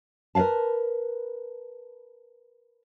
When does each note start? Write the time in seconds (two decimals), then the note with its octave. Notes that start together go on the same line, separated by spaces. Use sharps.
0.35 A#4 B4 D5 F5 A5